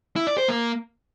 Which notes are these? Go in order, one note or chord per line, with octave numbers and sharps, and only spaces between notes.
E4
D5
C5
A#3